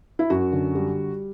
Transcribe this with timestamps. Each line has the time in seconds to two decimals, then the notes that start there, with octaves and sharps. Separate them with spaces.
0.19 E4
0.30 F#2 F#4
0.52 D3
0.75 G3